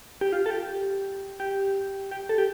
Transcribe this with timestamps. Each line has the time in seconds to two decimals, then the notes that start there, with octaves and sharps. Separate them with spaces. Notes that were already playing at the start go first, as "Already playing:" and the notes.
0.21 G4
0.33 F4
0.46 A4
0.50 G4
1.40 G4
2.11 G4
2.29 A4
2.38 G4